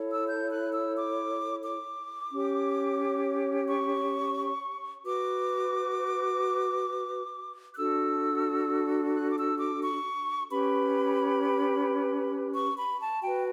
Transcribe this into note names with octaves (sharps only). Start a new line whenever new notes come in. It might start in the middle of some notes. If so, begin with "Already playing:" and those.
Already playing: E4 A4 C#5
E6
G6
F#6
E6
D6
D6
C#4 G4 C#5
C#6
F#4 B4 D6
F#6
D4 F#4 A4 E6
F#6
D6
E6
D6
C#6
C#4 G4 B4 B5
C#6
B5
A5
F#4 B4 G5